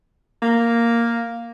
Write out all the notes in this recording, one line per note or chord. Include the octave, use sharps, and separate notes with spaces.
A#3